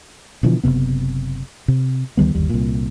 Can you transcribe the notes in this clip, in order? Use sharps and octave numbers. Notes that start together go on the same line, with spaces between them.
B2 D3 E3 F3
F#1 G2 C3 B3
C3
D2 D#3 G3 B3
G1 D#2 G3
C2 A#2